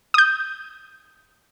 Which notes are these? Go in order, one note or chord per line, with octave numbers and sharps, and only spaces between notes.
D#6 G6